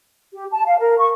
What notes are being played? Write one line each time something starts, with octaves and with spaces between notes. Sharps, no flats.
G4
A5
F5
A#4
C#6